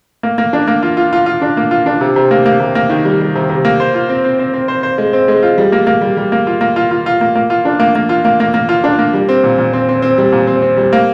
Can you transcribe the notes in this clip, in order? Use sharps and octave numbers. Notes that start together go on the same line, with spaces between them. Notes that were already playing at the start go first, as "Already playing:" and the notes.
A#3
A#3
D4
A#3
F4
F4
F4
F4
D4
A#3
F4
D4
C3
C3
A#3
A#3
C3
A#3
D#3
G3
G3
C3
C3
A#3
C5
F4
C4
C4
C4
C4
C5
C5
G#3
C4
G#3
F4
G3
A#3
A#3
G3
G3
A#3
F4
A#3
F4
F4
F4
A#3
A#3
F4
D4
A#3
A#3
F4
A#3
A#3
A#3
F4
D4
A#3
G3
C4
A#2
A#2
C4
C4
C4
G3
A#2
C4
C4
G3
A#3